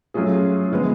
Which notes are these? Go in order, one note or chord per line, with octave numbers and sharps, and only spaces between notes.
F#3 A3 C#4 F4 G#4
D3 F3 G#3 B3